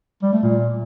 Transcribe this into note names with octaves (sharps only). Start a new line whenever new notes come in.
G3
A3
A#2